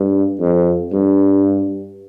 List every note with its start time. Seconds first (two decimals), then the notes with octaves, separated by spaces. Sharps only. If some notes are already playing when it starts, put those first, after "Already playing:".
Already playing: G2
0.41 F2
0.92 G2